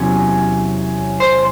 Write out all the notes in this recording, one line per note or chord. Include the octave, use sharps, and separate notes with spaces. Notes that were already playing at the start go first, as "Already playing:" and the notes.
Already playing: E2 C3 F#3 C#4
C5